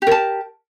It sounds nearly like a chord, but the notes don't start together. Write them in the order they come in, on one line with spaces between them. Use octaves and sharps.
G4 A#4 A5